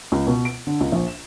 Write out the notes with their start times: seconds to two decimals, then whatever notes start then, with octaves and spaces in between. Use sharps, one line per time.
0.12 C#2
0.27 B2
0.45 D7
0.67 D3
0.80 C#2
0.92 A#1
1.08 E7